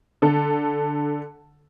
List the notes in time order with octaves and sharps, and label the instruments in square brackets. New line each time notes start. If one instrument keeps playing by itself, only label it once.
[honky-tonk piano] D3 A4